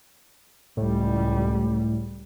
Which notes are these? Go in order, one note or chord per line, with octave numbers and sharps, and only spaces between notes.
C#2 A2 G3